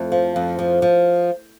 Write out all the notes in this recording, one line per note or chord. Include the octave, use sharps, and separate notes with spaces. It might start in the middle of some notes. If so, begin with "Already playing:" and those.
Already playing: F2 A3
F3
F2
F3
F3